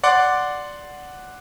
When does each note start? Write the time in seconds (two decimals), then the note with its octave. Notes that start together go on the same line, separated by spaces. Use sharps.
0.03 D5 F#5 C6 D6